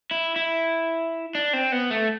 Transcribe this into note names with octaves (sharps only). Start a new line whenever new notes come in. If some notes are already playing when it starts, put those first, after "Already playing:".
E4
E4
D4
C4
B3
A3